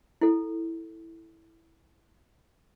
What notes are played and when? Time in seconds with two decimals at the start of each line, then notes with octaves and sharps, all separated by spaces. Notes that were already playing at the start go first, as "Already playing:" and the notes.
0.21 E4 A4